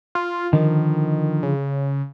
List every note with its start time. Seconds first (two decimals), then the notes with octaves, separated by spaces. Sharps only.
0.15 F4
0.53 D3 D#3 F3
1.43 C#3